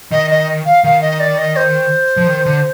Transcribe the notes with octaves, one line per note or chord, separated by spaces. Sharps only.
D#3 D#5
D#5
F5
D#3 F5
D#5
D5
D#5
C5
F3
D#3
D3